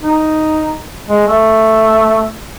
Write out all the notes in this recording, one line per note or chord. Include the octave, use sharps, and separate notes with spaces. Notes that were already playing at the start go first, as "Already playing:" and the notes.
D#4
G#3
A3